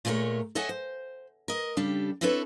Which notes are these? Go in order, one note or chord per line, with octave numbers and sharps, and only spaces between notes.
A#2 G#3 A3 C#4 A#4 C#5
A4 C#5 D#5 E5 F#5 G#5
C5
A#4 D#5
C#3 G3 D4 G4 A4
C4 D4 E4 A4 B4 C#5